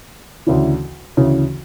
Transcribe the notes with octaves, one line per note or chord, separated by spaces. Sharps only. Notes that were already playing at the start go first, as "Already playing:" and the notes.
D2 C#3 E3
D2 C#3 E3